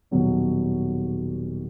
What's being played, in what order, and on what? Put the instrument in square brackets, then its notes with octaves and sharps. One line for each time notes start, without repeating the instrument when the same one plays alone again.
[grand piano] D#1 B2 F#3 C#4